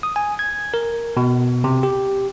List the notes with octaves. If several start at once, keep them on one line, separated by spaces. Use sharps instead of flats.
D#6
G#5
G#6
A#4
B2
C3
G4